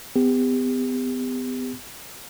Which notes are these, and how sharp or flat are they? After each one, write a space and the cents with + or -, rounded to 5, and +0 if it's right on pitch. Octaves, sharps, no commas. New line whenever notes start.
B3 +35 G4 +35